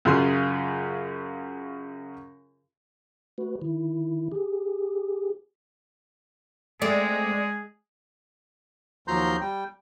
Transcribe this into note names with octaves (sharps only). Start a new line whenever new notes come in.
F#2 C#3 F4 G#4 C6
A3 F#4 B4
D#3 E4
G4 G#4
G#3 A3 C4 G#4 D5
D#2 F3 F#3 A#5 C6 G6
G3 G5